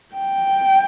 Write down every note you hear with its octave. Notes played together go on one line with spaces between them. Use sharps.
G5